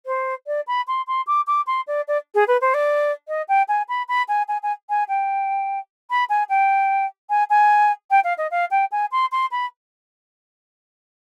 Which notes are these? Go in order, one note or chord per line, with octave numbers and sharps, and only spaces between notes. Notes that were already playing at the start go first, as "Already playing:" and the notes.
C5
D5
B5
C6
C6
D6
D6
C6
D5
D5
G#4
B4
C5
D5
D#5
G5
G#5
B5
B5
G#5
G#5
G#5
G#5
G5
B5
G#5
G5
G#5
G#5
G5
F5
D#5
F5
G5
G#5
C6
C6
B5